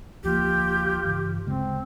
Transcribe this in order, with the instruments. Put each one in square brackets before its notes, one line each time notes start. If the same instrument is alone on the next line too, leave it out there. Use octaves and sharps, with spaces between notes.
[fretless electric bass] D2 F3 A#3 [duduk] F4 [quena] G4
[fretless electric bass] G2 C#3 E3
[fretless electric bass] D2 C#3 G#3 [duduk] C4